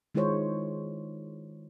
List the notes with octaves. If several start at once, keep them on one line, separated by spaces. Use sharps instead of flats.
D#3 G#3 E4 F4 C5 C#5